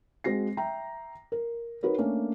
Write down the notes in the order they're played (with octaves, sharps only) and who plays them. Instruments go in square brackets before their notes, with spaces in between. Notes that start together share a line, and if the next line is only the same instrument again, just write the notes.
[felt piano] G#3 C4 F#4 A#6 C7
E5 G5 A#5
A#4
D#4 F#4 A#4 B4 C#5
A3 A#3 C#4 D4